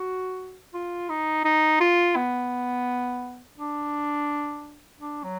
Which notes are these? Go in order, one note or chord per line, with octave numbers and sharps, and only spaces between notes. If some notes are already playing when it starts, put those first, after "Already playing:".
Already playing: F#4
F4
D#4
D#4
F4
B3
D4
D4
F#3